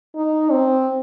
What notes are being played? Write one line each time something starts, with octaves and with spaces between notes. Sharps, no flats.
D#4
C4